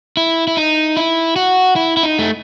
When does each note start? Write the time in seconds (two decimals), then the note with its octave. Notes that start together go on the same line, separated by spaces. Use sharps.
0.17 E4
0.47 E4
0.57 D#4
0.97 E4
1.36 F#4
1.76 E4
1.97 E4
2.03 D#4
2.19 A3